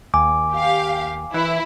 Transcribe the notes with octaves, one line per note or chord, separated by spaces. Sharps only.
D#2 G#5 D6
G4 F5
E3 E4